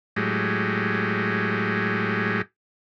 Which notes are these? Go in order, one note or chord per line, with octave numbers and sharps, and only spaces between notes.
A2 F#3 G#3 G4